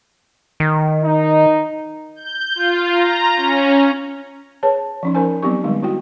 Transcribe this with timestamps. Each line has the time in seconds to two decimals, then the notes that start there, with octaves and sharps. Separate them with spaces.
0.60 D#3
1.03 D#4
2.16 G6
2.55 F4
2.93 A#5
3.37 C#4
4.63 G#4 B4 C#5 A5
5.03 F3 C#4 D#4
5.15 C#4 D#4 A#4 C5 G#5
5.42 F#3 B3 C4 D#4 G4 C#6
5.64 D3 G3 G#3 D#4
5.83 E4 F#4 G5